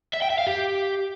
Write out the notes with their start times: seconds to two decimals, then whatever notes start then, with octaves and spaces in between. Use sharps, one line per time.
0.13 E5
0.22 G5
0.30 E5
0.38 F5
0.47 G4